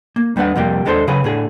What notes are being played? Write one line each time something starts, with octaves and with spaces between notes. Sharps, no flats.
A#3
D#2 G3 D4 B4 F#5
F2 C3 G3 A#3 G4
D#2 G#3 D4 A4 A#4 C5
C#3 F#3 G#4 B4
A2 D3 G#4